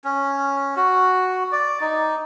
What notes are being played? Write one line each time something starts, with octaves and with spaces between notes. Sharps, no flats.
C#4
F#4
D5
D#4